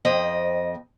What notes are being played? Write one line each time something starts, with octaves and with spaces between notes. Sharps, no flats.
F2 C4 D#5